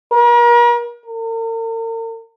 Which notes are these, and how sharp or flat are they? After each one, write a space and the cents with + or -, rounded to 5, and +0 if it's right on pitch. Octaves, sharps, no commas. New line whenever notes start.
A#4 +40
A#4 -45